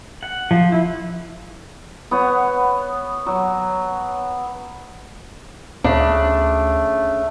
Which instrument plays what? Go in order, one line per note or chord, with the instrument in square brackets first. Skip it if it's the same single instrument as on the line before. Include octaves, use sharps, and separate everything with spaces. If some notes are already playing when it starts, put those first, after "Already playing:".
[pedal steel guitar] F#5
F3
E4
[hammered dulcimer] B3 C#5 F#5
F#3
[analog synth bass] D2 [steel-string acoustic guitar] C#3 D4 [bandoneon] A3